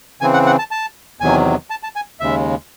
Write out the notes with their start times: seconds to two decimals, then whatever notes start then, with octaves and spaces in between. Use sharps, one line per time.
0.21 C#3 E3 C4 G#5
0.34 F#5
0.46 F#5
0.59 A5
0.71 A5
1.20 E2 C3 D#3 F#3 G#5
1.70 A5
1.83 A5
1.96 G#5
2.20 D#2 C#3 G#3 E5